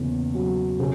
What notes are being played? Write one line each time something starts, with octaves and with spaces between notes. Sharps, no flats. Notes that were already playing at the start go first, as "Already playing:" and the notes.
Already playing: E2 C#3 A#3
F#3
C#3